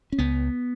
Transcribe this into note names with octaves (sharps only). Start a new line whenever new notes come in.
C#4
C#2 B3